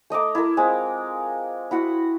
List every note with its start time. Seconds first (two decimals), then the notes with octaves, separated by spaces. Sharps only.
0.10 A3 D#5 A#5 D6
0.35 E4 A#4
0.57 G#3 C4 F4
1.71 E4 F#4 F#5 A5